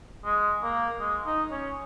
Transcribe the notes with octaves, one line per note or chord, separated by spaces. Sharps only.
G#3
A#3
G#3
D#4
C#4